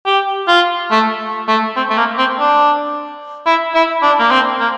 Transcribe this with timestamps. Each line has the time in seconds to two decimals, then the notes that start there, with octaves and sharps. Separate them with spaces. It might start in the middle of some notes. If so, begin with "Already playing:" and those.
0.06 G4
0.48 F4
0.91 A3
1.48 A3
1.76 C4
1.90 A3
1.97 A#3
2.18 C4
2.40 D4
3.46 E4
3.75 E4
4.03 D4
4.19 A#3
4.31 C4
4.59 A#3